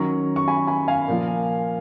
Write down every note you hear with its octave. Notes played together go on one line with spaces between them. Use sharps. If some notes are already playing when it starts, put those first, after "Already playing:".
Already playing: D#3 F#3 C#4 A#5 C#6
C#6
G#5 B5
G#5 B5
F5 G#5
A#2 F3 A#3